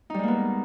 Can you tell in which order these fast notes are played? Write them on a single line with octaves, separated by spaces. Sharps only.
D#4 G3 G#3 A#3 B3